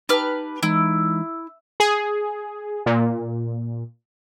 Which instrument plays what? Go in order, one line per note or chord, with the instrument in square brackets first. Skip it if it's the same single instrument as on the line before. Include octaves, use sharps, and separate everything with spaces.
[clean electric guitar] D#4 A5 [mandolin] G4 B4 F6
[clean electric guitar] E3 G#3 D#4 [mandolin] E4
[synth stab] G#4
A#2